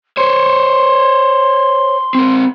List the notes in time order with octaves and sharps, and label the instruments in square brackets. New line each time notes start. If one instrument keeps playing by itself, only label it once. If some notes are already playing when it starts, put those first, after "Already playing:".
[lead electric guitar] C5 C#5 [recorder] C6
[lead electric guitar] C4 A#4